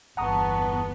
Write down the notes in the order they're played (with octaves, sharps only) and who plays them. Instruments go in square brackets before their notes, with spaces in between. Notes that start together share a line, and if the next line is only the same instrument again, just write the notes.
[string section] G1 E2 B3 [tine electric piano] F#5 A#5 D#6 [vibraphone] A5 C#6